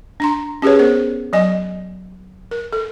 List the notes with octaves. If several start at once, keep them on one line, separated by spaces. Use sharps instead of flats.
D4 A#5 C6
C#4 G4 G#4 B4 C#5
B3 A#4 C5
F#3 D#5 G#5
A#4
A4